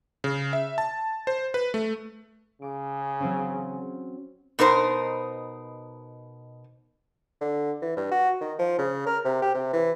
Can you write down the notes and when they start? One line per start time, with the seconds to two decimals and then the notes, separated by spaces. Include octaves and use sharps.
0.24 C#3
0.53 E5
0.78 A5
1.27 C5
1.54 B4
1.74 A3
2.62 C#3 D6
3.20 F#3 C4 C#4
4.59 B2 D#4 A#4 C5
7.41 D3
7.82 E3
7.97 G2
8.11 F#4
8.41 D#3
8.58 F3
8.79 C#3
9.06 A#4
9.25 C3
9.42 G4
9.55 C3
9.73 E3